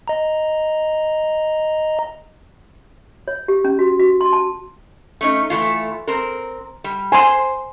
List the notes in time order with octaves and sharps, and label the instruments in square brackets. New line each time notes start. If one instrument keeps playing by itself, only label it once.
[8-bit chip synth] D#5 A#5
[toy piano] C#5
G4
C#4
F#4
F#4
C6
A5
[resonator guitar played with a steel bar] A3 C#4 D#4
E3 A3 F4
C4 A#4
G3
[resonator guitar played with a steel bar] C5 [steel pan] G#5 C6